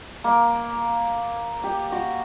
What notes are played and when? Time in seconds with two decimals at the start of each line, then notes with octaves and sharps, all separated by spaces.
0.24 A#3
1.64 G4
1.92 F#4